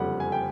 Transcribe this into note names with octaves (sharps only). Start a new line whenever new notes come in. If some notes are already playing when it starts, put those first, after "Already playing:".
Already playing: F#1 F2 D3 G3 F#5
G#5
G5